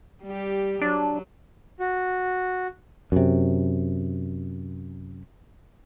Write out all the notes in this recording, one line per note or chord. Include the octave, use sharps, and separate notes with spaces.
G3 G4
F#3 D4
F#4
F#2 C3